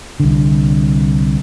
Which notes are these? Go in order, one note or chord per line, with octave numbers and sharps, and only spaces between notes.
C2 D3